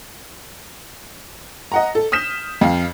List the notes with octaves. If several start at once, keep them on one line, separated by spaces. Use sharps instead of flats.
D#5 F#5 A#5
A4
D#6 F6 G6 B6 E7
F2 F5